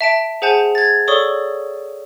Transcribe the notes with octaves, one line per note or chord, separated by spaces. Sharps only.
E5 A5 D7
G#4 C5 F#5 G#5 A5 G6
G#6 A6
A4 C#5 D5 C#6 D#6 G7